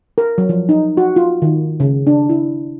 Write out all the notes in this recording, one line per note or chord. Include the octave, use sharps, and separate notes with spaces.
A#4
F#3
F3
D#4
F#4
F4
D#3
C#3
D4
E4